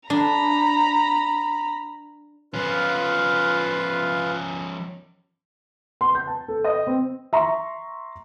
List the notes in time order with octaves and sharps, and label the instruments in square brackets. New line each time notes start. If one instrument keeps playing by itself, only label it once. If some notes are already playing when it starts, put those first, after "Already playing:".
[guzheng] D4 [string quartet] A#5 B5
[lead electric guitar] F3 C#4 [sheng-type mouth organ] F4 B4 F5
[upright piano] C6
G6
A5
A4
D#5
C4
[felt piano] E5 A#5 C6 C#6